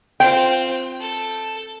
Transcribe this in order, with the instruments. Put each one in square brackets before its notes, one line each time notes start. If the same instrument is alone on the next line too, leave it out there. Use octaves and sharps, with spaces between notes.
[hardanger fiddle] C4 F4 [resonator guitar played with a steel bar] G5
[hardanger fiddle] A4